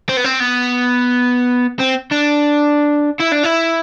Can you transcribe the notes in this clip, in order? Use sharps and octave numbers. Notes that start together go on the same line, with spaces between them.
C4
B3
C4
B3
C4
D4
E4
D4
E4